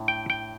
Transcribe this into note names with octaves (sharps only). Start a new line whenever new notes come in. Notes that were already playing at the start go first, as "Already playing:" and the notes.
Already playing: A2 D4
G5
G5